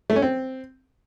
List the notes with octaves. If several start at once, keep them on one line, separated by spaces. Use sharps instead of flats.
A3
C#4
C4